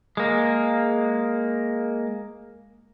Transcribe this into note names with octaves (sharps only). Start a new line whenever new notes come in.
G#3 A#3